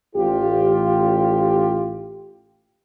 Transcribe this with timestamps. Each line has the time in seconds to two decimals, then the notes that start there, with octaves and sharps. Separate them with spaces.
0.15 A1 F4 G4